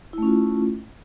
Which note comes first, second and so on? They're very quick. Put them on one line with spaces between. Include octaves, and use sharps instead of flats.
E4 A3 C#4 F4